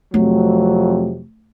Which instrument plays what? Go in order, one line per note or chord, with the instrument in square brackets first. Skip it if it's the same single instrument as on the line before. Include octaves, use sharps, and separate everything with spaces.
[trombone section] F2 C3 F#3 [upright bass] A3